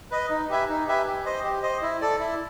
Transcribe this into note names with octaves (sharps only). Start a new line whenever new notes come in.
B4 D#5
D#4
G4 B4 E5 G#5
D#4
G4 B4 E5 G#5
G4
C5 D#5
G4
C5 D#5
E4
A4 D5
E4